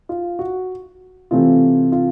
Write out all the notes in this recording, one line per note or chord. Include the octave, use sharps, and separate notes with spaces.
F4
F#4
C3 E3 A3 C4 F4
F4